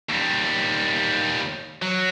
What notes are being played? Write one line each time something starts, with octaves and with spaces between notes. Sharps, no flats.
D#2 G3
F#3